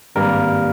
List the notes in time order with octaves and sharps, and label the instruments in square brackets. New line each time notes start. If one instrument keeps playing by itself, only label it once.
[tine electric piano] G#1 G2 G3 A#3 A#4